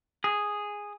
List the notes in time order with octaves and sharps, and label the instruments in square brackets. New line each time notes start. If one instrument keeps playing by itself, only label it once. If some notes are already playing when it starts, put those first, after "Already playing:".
[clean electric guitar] G#4